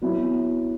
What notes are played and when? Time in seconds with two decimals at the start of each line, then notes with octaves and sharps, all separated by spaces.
0.02 F#3 B3 E4